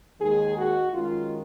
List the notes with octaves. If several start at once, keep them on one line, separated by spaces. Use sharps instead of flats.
D#2 D#3 G#3 G#4
F#4
F#2 D#3 G#3 F4